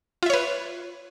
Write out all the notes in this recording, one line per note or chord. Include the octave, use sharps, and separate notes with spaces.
F4 B4 C#5 E5